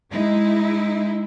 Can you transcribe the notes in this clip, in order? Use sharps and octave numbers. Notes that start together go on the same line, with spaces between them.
G#3 D#4 E4